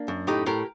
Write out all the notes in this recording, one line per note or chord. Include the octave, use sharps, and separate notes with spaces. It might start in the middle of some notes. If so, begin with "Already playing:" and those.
Already playing: A#3 D4
F#2
A2 D#4 G4
A2 G4 A#4